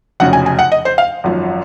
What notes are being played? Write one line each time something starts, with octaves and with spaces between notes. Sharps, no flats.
F1 F2 C#3 F#3 F#5
G#5
G#5
F#5
D#5
C5
F5
G#1 F#2 F3